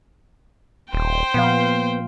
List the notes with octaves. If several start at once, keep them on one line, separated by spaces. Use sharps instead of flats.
D#1 C5 G5
A#2 F3 B3 F5